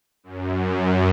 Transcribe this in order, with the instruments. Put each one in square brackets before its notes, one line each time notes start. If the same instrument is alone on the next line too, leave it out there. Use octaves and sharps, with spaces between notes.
[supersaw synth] F#2